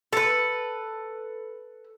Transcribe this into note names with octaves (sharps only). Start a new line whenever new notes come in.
A4 B4